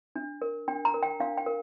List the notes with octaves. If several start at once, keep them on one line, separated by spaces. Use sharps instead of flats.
D4
A#4
D4 G5
A#5
A#4
G5
D4 F5
G5
A#4